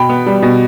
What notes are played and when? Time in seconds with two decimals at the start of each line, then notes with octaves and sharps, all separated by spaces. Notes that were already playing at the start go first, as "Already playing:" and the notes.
Already playing: B2 G5 B5
0.09 B3
0.26 G3
0.42 B2